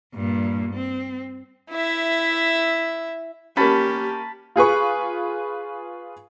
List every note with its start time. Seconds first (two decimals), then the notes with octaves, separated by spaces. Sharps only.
0.14 G2 A#2
0.74 C4
1.71 E4 E5
3.57 A#3 C#4 G4 A5 B5
4.56 F4 G#4 B4 C#6